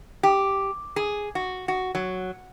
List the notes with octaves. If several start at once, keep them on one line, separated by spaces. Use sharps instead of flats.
G4
G#4
F#4
F#4
F#3